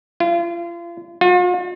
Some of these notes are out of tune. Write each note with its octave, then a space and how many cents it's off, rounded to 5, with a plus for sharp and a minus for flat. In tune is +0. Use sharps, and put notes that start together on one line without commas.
F4 -35
F4 +45